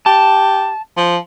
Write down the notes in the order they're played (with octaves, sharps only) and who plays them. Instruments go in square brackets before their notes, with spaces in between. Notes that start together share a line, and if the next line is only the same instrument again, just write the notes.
[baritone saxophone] G4 [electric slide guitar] A5
[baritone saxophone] F3